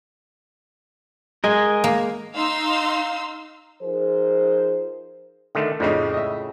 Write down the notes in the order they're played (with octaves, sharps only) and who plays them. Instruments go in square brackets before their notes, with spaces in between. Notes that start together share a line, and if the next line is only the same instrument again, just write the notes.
[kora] G#3 [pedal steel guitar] A#4 D#5 G#5
[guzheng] A#3
[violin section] D#4 F5 C6 E6
[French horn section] F3 D#4 G#4 A#4 C5
[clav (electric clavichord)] D3 D#3 A3
[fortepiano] F2 D4 D#4 [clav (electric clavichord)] A2 C#3
[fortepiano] D#5 E5